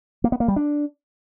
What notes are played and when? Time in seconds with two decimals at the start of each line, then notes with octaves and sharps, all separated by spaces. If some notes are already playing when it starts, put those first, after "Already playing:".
0.24 A#3
0.32 B3
0.40 A#3
0.48 G3
0.56 D4